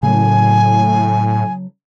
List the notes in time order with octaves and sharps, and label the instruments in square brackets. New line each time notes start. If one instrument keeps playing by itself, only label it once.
[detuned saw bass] A2 [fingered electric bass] C#3 F#3 [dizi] G#5